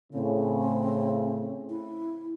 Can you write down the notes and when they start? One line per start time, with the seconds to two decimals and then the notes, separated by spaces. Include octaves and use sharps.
0.13 A2 C#3 C4
1.70 E4